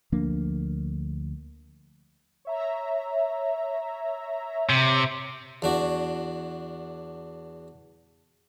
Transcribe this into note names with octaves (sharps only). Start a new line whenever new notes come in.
D2 F3 A#3 D4
C#5 E5 A#5
C3
E2 D4 F#4